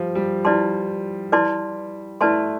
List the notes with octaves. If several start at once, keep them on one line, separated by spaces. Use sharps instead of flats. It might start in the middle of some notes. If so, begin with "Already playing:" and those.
Already playing: F3 G3
G3
G3 E4 B4 D5 A5 C6
E4 B4 D5 A5 C6
A3 E4 B4 D5 A5 C6